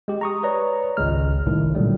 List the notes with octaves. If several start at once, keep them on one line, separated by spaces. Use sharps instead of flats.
G#3 G4
A#5 C#6 D#6
B4 C#5 D5 A#5
G#1 C#2 C#3 G#3 F6
G1 C2 A2 D#3
A#2 D3 F#3 G3 A3